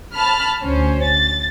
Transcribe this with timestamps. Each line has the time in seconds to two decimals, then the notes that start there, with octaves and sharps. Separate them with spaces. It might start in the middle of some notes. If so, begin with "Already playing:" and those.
0.14 A5 B5 F6
0.62 D2 C#4 C5
1.05 A6